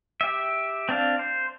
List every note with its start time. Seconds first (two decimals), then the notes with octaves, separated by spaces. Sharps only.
0.21 G4 E5
0.89 C4 D4 F5
1.19 C5